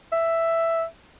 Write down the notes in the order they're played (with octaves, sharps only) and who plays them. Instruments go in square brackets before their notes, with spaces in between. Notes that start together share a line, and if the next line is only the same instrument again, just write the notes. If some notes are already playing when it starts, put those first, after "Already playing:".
[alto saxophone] E5